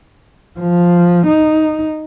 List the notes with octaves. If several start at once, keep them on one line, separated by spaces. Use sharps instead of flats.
F3
D#4